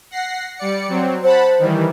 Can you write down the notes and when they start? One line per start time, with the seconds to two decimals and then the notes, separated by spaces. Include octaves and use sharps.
0.11 F#5 A#6 C7
0.57 G3 D5 C#7
0.88 F#3 C4
1.23 C5 F#5 A5 B5
1.59 D#3 E3 G3